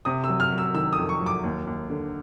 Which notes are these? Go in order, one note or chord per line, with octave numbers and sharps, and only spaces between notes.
C3 D#6
E6
F#3
F6
F#3
E6
D#3 E6
D#6
F2
C#6
F#3
D6
D#2
D#2
D3